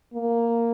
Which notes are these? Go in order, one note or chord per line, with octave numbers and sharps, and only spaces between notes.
A#3